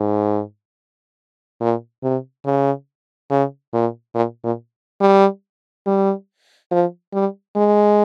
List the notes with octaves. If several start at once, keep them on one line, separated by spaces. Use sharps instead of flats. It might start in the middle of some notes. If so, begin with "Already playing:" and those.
Already playing: G#2
A#2
C3
C#3
C#3
A#2
A#2
A#2
G3
G3
F3
G3
G#3